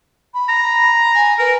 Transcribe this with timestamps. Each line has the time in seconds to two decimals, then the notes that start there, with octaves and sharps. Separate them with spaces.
0.33 B5
0.49 A#5
1.14 G#5
1.39 A#4 B4